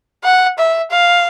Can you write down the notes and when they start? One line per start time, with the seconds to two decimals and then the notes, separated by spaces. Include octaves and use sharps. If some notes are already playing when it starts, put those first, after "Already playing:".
0.24 F#5
0.58 E5
0.91 F5